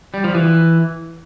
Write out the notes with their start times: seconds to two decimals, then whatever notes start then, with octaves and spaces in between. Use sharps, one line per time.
0.14 G3
0.24 F3
0.35 E3